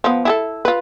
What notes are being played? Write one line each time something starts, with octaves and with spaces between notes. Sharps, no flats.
F3 B3
E4 G#4 A4
F4 B4